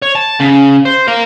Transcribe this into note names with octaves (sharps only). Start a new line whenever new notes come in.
C#5
A5
C#3
C5
A#4 F5